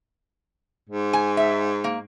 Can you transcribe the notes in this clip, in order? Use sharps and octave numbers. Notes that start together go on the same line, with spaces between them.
G#2
G#5
E5
A#3